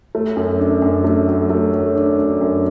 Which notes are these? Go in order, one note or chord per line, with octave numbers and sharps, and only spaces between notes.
A3
F#2
D4
F#2
A3
F#3
A3
F#3
D4
D4
F#2